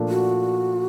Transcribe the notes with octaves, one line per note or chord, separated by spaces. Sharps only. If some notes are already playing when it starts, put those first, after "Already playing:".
Already playing: A#2 F3 A3 D4
F#4